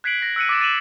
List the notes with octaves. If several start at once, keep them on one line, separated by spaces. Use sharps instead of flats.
F#6 G#6 B6 C7 D7 F#7
A#6
E6 F#6 C#7 D#7
D6 E6 A6 E7
A6 D#7 E7 F#7